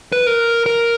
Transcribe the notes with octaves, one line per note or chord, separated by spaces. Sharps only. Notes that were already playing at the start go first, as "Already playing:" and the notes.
B4
A#4
A#4